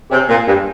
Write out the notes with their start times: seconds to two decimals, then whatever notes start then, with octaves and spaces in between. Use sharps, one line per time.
0.10 C3 G#4 C#5 G#5
0.29 A#2
0.47 G2